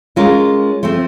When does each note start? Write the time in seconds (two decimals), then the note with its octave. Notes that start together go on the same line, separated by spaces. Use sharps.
0.16 G#3 C#4 F4 A#4
0.83 F3 A3 C4